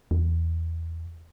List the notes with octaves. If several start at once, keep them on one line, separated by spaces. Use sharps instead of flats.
E2